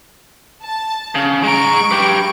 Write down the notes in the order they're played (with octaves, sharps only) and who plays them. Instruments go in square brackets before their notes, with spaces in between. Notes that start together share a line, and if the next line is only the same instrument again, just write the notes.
[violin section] A5
[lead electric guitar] C#3
[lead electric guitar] G#3 A#5 [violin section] C#6 D7
[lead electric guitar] G4 B4